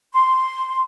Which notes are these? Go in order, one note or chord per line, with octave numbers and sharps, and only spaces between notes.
C6